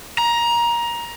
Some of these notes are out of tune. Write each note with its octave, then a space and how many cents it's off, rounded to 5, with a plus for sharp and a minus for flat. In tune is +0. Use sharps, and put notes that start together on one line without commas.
A#5 +20